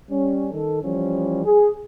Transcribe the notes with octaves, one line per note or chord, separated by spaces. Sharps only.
G3 C#4
D#3 A4
E3 F3 G3 C#4
G#4